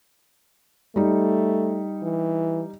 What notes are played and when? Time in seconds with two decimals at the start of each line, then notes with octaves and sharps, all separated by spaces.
0.96 G3 A3 D#4
2.03 E3